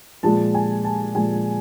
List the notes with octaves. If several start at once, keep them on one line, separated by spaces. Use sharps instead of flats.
A#2 F3 G#3 A5
G#5
A5
A#2 F3 G#3 G#5